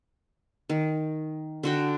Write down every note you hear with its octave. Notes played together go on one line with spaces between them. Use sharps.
D#3
D3 F#4 G5